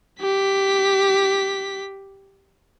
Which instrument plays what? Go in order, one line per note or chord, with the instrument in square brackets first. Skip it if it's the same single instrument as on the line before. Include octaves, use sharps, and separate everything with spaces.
[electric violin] G4 B6